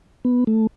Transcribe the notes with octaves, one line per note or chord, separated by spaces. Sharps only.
B3
A3